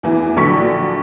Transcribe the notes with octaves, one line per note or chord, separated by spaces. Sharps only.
E2 E3
A#1 D3 F#3 C#6 B6